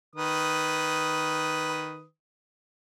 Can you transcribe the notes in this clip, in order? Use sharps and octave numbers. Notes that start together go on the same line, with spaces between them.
D#3 B4 D#6